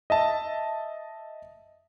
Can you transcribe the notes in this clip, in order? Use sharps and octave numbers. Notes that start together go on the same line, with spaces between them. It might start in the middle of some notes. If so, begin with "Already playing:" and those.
D#5 E5 A5